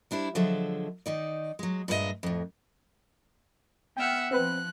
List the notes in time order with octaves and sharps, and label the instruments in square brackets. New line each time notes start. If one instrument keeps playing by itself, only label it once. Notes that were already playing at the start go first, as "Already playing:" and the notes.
[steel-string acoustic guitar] G3 D4 E4 C5
D3 F3 F#3 G#3 A4 E5
D#3 D#4 D5
F#3 G#3
G2 A#2 G#3 C#4 D#5 E5
F2 A2
[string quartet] B3 E5 F#5 [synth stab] G5 F6
[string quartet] F3 F#6 [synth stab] C4 B4